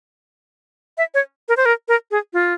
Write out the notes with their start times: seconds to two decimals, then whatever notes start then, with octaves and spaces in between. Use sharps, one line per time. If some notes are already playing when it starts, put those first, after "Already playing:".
0.98 E5
1.14 C#5
1.49 A#4
1.57 C5
1.66 A#4
1.88 A#4
2.11 G#4
2.33 F4